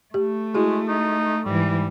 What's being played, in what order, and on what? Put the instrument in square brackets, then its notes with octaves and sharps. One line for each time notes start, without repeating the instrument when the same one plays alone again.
[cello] A3 [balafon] G4
[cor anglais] G#3 [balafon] E4 F#4 G#4
[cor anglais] D#4
[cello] G#2 E3 [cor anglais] G3